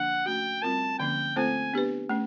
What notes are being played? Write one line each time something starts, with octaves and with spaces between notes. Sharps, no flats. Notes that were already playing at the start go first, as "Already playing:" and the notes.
Already playing: D3 F3 A#3 D4 F#5
A3 C#4 F#4 G5
G3 C4 F4 A#4 A5
D3 F3 A#3 C#4 G5
A3 C4 F4 A4 C5 G#5
B3 D4 G4 B4
A3 C#4